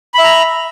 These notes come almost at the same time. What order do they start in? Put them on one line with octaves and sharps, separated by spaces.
B5 E5 A#5